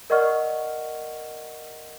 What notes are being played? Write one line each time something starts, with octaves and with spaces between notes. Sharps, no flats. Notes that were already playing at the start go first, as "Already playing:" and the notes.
A#4 D5 D#5 F#5 C#6 F6